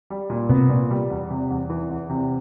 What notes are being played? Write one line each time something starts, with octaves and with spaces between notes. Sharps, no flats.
G3
A#2
C3 B3
A#2
G3
E2
C3
E2
E3
E2
C3